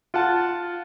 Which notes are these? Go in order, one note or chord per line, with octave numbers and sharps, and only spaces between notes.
F4 F#5 A5